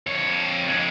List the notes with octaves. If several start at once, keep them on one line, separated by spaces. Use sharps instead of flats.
F2 C#5
F2 G#3